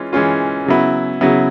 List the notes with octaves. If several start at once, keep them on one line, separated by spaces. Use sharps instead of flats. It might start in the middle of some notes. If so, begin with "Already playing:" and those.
Already playing: E3 G#3 C#4 F4
E3 G#3 C#4 F4
C#3 F#3 B3 E4
C#3 F#3 B3 E4